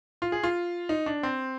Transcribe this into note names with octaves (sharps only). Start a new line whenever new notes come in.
F4
G#4
F4
D#4
D4
C4